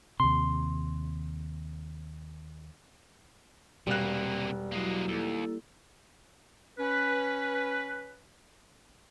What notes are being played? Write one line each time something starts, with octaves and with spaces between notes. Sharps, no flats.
D#2 C3 C6
E1 C3 G3 A#3 F#6
F#3 G#3 A#3 E4 F#4
D#2 A#3 E4 A4
C#4 B4